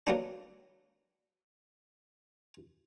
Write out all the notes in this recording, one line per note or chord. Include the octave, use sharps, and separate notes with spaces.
F#3 A#3 B3 D4